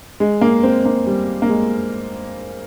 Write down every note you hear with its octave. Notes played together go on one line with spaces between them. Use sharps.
G#3
A#3
C4
A#3
G3
A#3
G#3